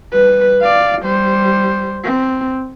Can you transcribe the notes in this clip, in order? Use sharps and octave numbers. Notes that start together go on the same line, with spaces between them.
G3 B4
D5 F5
G3 C5
C4